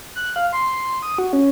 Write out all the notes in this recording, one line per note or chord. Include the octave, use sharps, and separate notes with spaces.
F#6
F5
C6
D#6
F#4
C#4